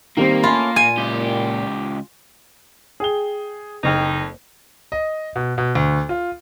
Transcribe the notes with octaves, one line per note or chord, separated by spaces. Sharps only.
D#3 G3 A#3 C4
A3 C#4 F4 A4 B5
A#2 G#5
C#2 G4
G#4 G5 G7
F#1 F2 D#4 G5
D#5
B2
B2
D2
F4